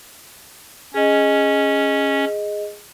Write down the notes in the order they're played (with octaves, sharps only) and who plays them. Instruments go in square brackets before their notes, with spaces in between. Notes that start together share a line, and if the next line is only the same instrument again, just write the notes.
[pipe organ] C#4 [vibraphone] G#4 D#5